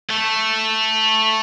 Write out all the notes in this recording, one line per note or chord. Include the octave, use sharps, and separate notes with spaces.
A3